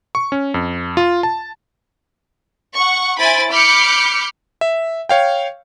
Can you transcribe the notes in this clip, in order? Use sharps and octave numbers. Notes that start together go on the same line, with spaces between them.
C#6
C#4
F2
F4
A5
F#5 C#6
E4 C5 G#5 B5 A6 D7
B5 D6 F6 G6 C#7
E5
C#5 F5 G5